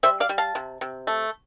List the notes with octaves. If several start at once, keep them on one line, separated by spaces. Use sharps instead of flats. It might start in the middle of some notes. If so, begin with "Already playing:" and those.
G3 C5 E5
D5 F5
G3
F5 A5
C3
C3
A3